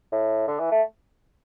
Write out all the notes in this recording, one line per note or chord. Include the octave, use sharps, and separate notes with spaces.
A2
D3
E3
A3